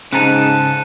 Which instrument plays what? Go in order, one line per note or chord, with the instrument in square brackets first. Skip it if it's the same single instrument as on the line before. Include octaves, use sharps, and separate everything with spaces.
[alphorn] G#2 [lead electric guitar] C#3 A4 [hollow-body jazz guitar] C#4 G#5 A#5 [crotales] F#6 D#7